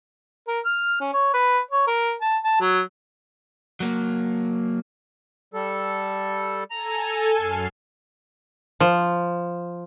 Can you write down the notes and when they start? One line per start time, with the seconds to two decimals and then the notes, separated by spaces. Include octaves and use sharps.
0.48 A#4
0.65 F6
1.00 C#4
1.13 C#5
1.34 B4
1.71 C#5
1.87 A#4
2.22 A5
2.44 A5
2.61 F#3
3.80 F#3 A#3
5.54 G3 A4
6.70 A4 G#5 A#5
7.37 F#2 F6 C7
8.80 F3